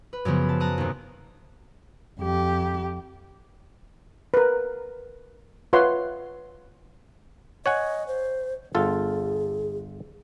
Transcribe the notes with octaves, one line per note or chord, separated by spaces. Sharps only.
B4
F#2 C#3 F3 B3
A5
A5 A#5 D#6 F#6
D#2 C3
F2 G4
A#4 B4
F4 B4 C#5 E5 F#5 C6
C#5 D#5 F#5 G#5
C5
G1 F4 G#4 A4